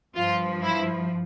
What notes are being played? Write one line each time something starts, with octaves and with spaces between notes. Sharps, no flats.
G2 F3 F4
E4